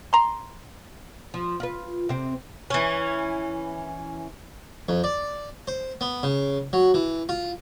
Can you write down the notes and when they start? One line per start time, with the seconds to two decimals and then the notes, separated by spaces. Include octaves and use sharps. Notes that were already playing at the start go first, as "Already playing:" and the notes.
0.13 A#5 C6
1.34 F3
1.60 F4 B4
2.09 C3 C4
2.70 E3 C#4
4.89 F2
5.04 D5
5.68 C5
6.01 B3
6.23 C#3
6.73 F#3
6.94 E3
7.29 F4